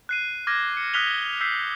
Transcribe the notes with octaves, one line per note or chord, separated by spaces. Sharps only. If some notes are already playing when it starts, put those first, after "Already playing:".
F#6 C7 D#7
D6 F6 G#6 A#6
C#7
D#6 F6 F#6 B6 F7 G7
E6 G6 B6 C7